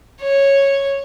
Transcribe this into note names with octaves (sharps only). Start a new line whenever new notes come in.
C#5